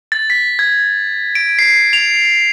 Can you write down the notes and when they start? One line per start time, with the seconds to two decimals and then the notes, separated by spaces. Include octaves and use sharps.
0.12 A6
0.30 B6
0.59 G#6
1.35 D7
1.59 C7
1.93 F7